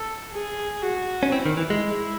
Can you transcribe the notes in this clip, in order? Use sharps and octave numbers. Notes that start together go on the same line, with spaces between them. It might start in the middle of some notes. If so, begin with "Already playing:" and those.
Already playing: A4
G#4
F#4
C#4
C4 E4
D#3
E3
G#3